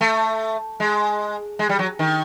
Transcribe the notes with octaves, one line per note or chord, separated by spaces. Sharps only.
A3
G#3
G#3
G3
F#3
D#3